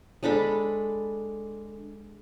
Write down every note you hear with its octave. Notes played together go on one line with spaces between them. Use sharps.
G#3 D4 A4 B5